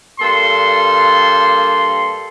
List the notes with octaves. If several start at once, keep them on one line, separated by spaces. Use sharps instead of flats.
G2 A#3 A4 C6